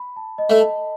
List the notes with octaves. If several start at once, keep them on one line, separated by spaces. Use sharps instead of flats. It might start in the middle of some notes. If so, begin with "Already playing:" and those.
Already playing: B5
A5
D#5
A3
A5